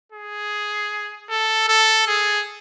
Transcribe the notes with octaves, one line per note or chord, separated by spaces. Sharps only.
G#4
A4
A4
G#4